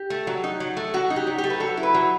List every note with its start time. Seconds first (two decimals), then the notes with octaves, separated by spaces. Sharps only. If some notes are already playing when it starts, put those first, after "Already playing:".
Already playing: G4
0.10 A3
0.27 F#3
0.44 D#4
0.60 F#3
0.77 A3
0.94 F#3 F#4
1.10 D#4
1.16 G4
1.27 F#3
1.38 G4
1.44 A3
1.50 B4
1.60 F#3 A4
1.77 E4
1.83 B4
1.94 F#3